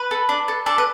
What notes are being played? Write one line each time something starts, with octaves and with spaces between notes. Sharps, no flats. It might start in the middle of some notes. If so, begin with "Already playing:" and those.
Already playing: B4
A4
D4
A4
D4 A4
B4